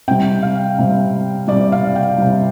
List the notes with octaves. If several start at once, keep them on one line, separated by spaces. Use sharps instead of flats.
C3 G3 G5
F5
C3 G3
C3 G3 D5
F5
G5
C3 G3